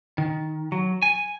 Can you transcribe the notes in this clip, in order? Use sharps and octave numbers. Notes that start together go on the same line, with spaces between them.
D#3
F#3
G#5